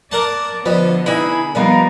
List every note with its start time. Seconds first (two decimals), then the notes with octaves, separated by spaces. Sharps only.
0.12 A#4 D5 F#5 A5
0.66 D3 F3 B3 B4 D#5
1.06 D#4 E4 G#4 B4 B5
1.55 F3 G3 B3 D#4 A#4 F5 A#5